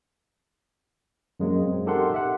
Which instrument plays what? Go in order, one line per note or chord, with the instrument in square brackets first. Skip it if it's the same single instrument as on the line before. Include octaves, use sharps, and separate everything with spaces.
[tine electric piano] F#2 F#3 G#3 A#3
C4
D#4 G4 A4 A#4 F#5 C6
G4 E5 F#5